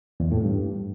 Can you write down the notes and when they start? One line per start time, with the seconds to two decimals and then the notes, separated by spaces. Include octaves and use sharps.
0.20 E2
0.32 A2
0.44 G2